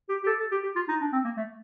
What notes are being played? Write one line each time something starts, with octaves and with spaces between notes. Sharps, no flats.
G4
G4
A4
A4
G4
G4
F4
D#4
D4
C4
A#3
A3